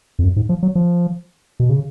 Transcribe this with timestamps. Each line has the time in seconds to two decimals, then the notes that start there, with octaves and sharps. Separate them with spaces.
0.19 F2
0.23 F#2
0.36 G#2
0.49 F3
0.63 F#3
0.75 F3
1.60 B2
1.70 C#3